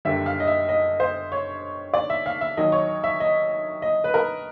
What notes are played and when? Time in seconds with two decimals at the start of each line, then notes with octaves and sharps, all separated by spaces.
0.05 F#1 F#2 D3 G3 E5
0.26 F5
0.40 D#5
0.47 E5
0.69 D#5
1.00 C5
1.32 C#5
1.94 D5
2.10 E5
2.26 F5
2.41 E5
2.57 D#2 D#3 F#3 D#5
2.72 C#5
3.04 E5
3.20 D#5
3.82 D#5
4.04 B4
4.14 A#4